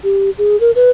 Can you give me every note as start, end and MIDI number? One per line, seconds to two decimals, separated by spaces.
0.04 0.30 67
0.38 0.59 68
0.60 0.71 70
0.75 0.90 71